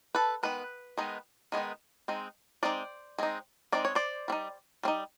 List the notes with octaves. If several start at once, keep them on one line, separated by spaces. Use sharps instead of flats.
A4 B4
D#3 G#3 B3 B4
D#3 G#3 B3 D#4
D#3 G#3 B3 D#4
G#3 C4 D#4
G#3 C4 D#4 C5 D5
G#3 C4 D#4
G#3 C4 D#4 D5
C#5
C5 D5
G3 C4 D#4
G3 C4 D#4